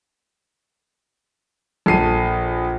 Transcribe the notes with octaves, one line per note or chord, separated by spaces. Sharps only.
A#1 A4 C7 D#7